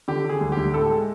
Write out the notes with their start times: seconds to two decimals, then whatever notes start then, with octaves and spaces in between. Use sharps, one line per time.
0.08 D3 G4
0.25 D3 G#4
0.41 D2
0.52 D2 G4
0.74 A2 A4
0.90 G#3